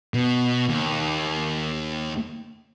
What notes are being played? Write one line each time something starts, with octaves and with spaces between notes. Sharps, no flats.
B2
D#2